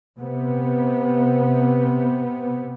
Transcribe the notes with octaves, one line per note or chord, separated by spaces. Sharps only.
C3 B3